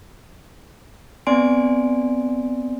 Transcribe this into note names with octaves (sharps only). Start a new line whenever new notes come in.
B3 C4 D5 G#5 C6 D7